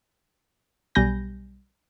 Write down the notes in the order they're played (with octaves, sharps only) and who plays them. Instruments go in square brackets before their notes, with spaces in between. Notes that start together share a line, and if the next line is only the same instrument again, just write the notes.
[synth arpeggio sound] B1 G3 G#5 B5 G6 A#6